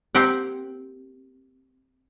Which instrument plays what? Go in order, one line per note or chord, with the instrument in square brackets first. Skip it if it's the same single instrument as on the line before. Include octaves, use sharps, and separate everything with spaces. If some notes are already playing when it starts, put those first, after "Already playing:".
[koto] A#3 C4 G4 F#5